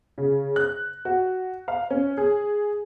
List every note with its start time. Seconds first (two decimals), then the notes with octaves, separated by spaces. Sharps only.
0.18 C#3
0.56 F#6
1.05 F#4
1.68 F5
1.90 C#4
2.18 G#4